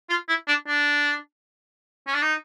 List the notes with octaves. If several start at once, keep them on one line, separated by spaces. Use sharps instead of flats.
F4
E4
D4
D4
C#4
D4
D#4